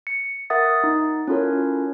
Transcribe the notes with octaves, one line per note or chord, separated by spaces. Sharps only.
C#7
A#4 E5 F#5 D#6 A6
D#4
C#4 E4 F4 A4 A#4 C#5